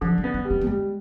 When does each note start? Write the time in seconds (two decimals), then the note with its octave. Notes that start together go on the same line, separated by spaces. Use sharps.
0.01 D3 F3
0.18 G3
0.24 B3
0.34 D4
0.45 G3
0.51 C4
0.61 B3
0.66 G3 G#3